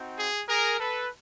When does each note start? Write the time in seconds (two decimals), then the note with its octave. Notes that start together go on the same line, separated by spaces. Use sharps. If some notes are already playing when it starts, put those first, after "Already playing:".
Already playing: C4 D#4 F#4
0.16 G#4
0.48 G#4 A#4
0.79 A4 B4